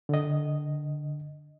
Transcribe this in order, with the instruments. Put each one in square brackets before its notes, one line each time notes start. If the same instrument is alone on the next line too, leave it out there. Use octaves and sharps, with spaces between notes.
[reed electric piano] D3 D#5